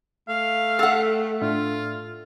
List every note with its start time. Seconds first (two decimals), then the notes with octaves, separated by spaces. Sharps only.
0.28 A3 F5
0.79 A4 F#5 G5
1.41 A2 D4 F4 E5